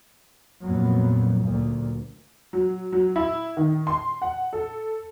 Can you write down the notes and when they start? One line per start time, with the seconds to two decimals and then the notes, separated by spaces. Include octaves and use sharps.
0.63 F2 A#2 F#3 B3
1.41 D2 A#2
2.53 F#3
2.92 F#3
3.16 E4
3.57 D#3
3.87 C6
4.22 F#5
4.53 A4